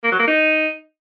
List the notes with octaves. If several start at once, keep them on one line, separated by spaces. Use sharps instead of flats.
A#3
F#3
A#3
D#4